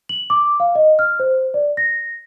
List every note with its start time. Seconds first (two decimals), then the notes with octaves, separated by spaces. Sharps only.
0.09 F#7
0.30 D6
0.60 F5
0.75 D#5
0.99 F6
1.20 C5
1.54 D5
1.77 A#6